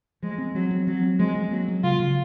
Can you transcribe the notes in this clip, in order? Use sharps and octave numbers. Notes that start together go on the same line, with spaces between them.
F3 G#3
C4
F3 F#3
C4
F3 F#3
C4
F3 G#3
C4
F#3 A#3
F#3
C#3 F4
C#3